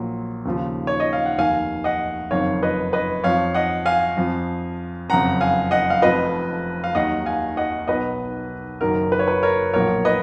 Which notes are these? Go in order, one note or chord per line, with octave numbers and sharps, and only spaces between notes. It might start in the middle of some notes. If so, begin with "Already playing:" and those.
Already playing: A#1 A#2 F#3
D#2 C#3 F3
C#5
D#5
F5
F#5
F1 D#2 D#3 F5 G#5
D#5 F#5
F#1 F2 D#3 C#5 F5
B4 D#5
B4 D#5
F2 F3 C#5 F5
D#5 F#5
F5 G#5
F2 F3
F#1 F2 C#3 F#5 A#5
F5 G#5
D#5 F#5
F5
F1 F2 F3 B4 D#5
F5
D#2 D#3 F#3 D#5 F#5
F5 G#5
D#5 F#5
B1 B2 F#3 B4 D#5
F#1 F#2 D#3 F#3 A#4
B4
C#5
B4
A#4 C#5
B1 A#2 F3 A#4 C#5
B4 D#5